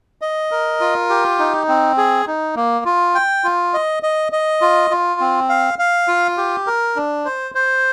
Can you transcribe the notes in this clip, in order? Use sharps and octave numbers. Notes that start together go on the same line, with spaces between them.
D#5
A#4
F4
G4
D#4
C4
G#4
D#4
A#3
F4
G5
F4
D#5
D#5
D#5
F4
F4
C4
F5
F5
F4
G4
A#4
D4
C5
C5